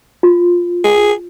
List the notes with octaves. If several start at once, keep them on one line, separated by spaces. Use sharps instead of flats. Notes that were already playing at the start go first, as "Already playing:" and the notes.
F4
G#4